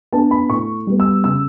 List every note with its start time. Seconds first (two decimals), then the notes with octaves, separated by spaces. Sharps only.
0.13 B3 D4 A5
0.31 B5
0.49 A2 C#6
0.87 G3 B3
1.00 E6
1.24 C#3 E6